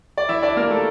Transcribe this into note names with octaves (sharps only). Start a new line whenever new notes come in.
D5
E3 E4 E5
D4 D5
A#3 A#4
A3 A4